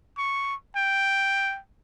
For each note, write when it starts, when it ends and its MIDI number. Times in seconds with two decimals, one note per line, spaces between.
0.18 0.55 85
0.76 1.60 79